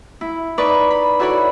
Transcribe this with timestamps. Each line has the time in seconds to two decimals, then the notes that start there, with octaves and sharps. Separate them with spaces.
0.21 E4
0.58 D#4 B4 D5 B5 C#6 D6
0.90 B5
1.19 E4 F#4 A4 C#5 D5 B5